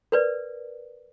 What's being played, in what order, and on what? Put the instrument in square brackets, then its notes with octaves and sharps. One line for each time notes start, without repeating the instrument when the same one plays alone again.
[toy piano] A#4 B4 D5